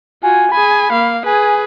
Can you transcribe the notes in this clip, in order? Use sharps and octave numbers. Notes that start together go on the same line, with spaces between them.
F4 F#4 G#5
G#4 G#5 B5
A#3 F5
G#4 B4 G#5